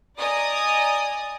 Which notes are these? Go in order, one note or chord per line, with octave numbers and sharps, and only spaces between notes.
D5 D#5 G#5 A#5 D#6